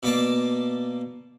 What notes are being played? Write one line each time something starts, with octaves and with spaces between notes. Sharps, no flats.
B2 A#3 D5 A5